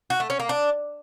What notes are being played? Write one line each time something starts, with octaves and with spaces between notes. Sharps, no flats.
F#4
A3
C#4
A#3
D4